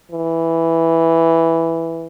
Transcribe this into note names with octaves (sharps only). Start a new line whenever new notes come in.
E3